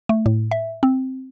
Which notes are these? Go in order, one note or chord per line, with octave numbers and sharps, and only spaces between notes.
A3
A2
E5
C4